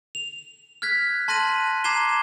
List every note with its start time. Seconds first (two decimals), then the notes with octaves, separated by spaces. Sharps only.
0.15 F7
0.82 F6 F#6 G#6 B6
1.28 A5 C6 F#6 A#6 D#7 F#7
1.84 A#5 D6 G#6 C7 E7 G7